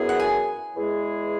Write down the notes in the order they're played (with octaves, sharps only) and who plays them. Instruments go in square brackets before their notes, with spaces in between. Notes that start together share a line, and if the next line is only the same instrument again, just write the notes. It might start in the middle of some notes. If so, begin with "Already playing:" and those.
Already playing: [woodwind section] F#2 E3 B3 E4 G#4
[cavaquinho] F#5
G#5
[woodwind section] E2 E3 G#3 E4 G#4